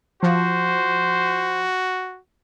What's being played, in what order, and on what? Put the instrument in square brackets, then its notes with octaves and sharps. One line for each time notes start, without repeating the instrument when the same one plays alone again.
[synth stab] F3 [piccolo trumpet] F#4 [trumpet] C5